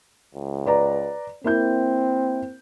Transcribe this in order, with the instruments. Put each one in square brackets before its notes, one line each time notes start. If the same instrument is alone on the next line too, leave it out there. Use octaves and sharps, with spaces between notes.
[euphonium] C#2
[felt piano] B4 D5 A#5
[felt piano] A#3 E4 G6 [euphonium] C4